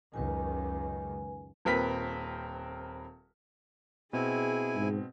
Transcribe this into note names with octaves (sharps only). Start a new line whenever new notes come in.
C#2 F#2 D#3 B4 G#5
D#1 C4 A#4 B4 B6
B2 C4 E4 G#4 G#5
G#2